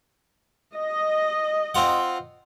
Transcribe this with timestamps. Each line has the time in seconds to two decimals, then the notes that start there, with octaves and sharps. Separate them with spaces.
0.76 D#5
1.75 C4 F4 F#5